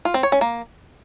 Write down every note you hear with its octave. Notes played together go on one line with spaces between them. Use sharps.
F4
C4
C#5
C#4
A#3